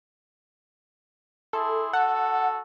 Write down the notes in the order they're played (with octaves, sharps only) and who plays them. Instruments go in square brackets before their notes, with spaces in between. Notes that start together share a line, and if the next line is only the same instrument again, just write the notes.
[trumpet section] E4 G#4 C6 [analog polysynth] A4
[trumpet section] F#4 A4 [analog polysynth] F#5